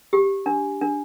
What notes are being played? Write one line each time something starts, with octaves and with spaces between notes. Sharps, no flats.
G4
D4
D4